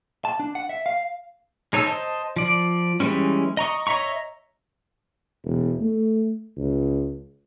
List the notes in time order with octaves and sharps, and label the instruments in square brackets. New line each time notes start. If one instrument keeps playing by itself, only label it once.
[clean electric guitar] A5
D4
F#5
E5
F5
[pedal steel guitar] G#3 D#4 C#5 A5 E6
C5 D#5 A5
F3 D5
E3 G3 G#3 C4 C#4
D#5 A#5 C#6 D#6
C#5 D#5 E5 A#5 C#6
[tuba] E1
A3
C#2